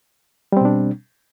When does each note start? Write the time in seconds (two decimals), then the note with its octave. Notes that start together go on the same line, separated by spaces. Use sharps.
0.52 G3
0.57 C4
0.61 B2
0.65 D4